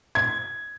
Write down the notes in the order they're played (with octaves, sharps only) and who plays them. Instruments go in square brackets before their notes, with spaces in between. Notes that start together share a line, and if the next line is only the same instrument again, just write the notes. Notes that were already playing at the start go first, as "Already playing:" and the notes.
[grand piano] G#6